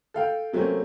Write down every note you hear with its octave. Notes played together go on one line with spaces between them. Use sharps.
A4 F5 G5
C3 F#3 A3 A#3 C4 C#4